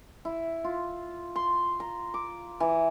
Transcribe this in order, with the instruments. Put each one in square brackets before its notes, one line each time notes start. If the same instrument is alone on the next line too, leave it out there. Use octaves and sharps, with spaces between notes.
[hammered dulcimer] E4
F4
C6
A#5
D6
E3